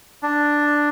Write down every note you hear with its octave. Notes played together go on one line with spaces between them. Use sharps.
D4